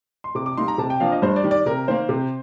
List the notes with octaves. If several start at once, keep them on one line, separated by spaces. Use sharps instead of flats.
C6
C3 D6
D6
G3 A#3 D#4 C6
A#5
C3 A5
G5
F3 A#3 D4 F5
D#5
G2 C5
D5
D#3 G3
D5
C3 A#4
D#3 A#3 C5
C3